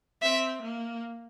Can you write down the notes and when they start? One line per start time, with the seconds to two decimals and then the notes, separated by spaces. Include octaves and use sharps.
0.22 C4 E5
0.62 A#3